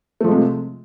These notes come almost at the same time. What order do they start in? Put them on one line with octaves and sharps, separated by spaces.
A3 F3 G#3 C3